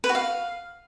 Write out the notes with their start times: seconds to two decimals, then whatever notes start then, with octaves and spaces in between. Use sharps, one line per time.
0.04 B4
0.09 F#4
0.15 F5